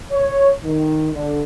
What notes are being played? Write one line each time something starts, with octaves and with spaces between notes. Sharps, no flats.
C#5
D#3
D3